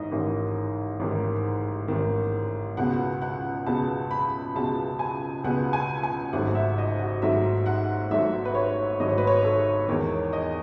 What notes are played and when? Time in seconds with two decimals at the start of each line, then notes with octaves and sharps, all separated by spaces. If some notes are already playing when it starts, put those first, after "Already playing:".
Already playing: A1 G#2 D#3 D#5
0.12 A1 G#2 D#3
1.00 A1 G#2 D#3
1.88 A1 G#2 D#3
2.77 C#2 B2 G#3 B3 F#5
3.22 F#5
3.66 C#2 B2 G#3 B3 A5
4.11 B5
4.55 C#2 B2 G#3 B3 A5
4.99 G#5
5.44 C#2 B2 G#3 B3 F#5
5.73 G#5
6.03 G#5
6.33 G#1 G#2 F#3 A3 F#5
6.55 E5
6.78 D#5
6.99 F#4
7.22 G#1 G#2 F#3 A3 E5
7.66 F#5
8.11 G#1 G#2 F#3 A3 E5
8.45 B4
8.55 C#5
8.99 G#1 G#2 F#3 A3 D#5
9.09 C#5
9.18 B4
9.27 C#5
9.44 A4
9.88 E2 D#3 G#3 C#5
10.33 D#5